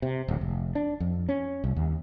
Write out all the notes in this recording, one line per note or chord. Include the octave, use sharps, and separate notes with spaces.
C3
D1
F1
D4
F2
C#4
C2
D#2